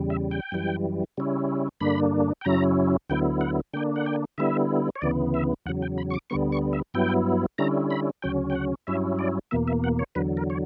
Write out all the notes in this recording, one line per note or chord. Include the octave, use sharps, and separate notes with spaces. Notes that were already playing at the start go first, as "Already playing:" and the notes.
Already playing: E2 C#3 G3
E5
G5
F#2 E3 G3
C#3 G3 C#4 E4
G2 D3 A#3 D4 B5
G5
F#2 C#3 F#3 C#4 E4 A#5
D2 D3 F#3 B3 E4 G5
F#5
D3 A#3 D4 G5
F#5
G5
D3 G3 B3 E4 E5
C#5
D2 C#3 E3 B3 D5
E5
E2 C#3 F#3 F#5
G5
B5
C#6
D6
D2 D3 G3 B3 C#6
C#6
E5
G2 F#3 B3 E4 G5
D3 G3 C#4 E4 A#5
B5
D2 C#3 F#3 C#4 G5
G5
F#5
G2 F#3 C#4 E4 E5
D5
E2 B2 A#3 E5
E5
F#5
C#5
E2 D3 F#3 B4
A#4
C#5